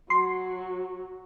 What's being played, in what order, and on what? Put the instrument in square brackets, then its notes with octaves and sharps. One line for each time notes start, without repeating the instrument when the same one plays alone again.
[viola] F#3 [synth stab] C6